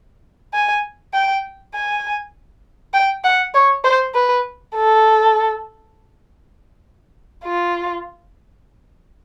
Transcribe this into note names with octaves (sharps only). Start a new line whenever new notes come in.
G#5
G5
G#5
G5
F#5
C#5
C5
B4
A4
F4